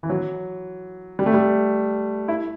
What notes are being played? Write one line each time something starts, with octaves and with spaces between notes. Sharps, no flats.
E3
F#3
G3
A3
G3
E4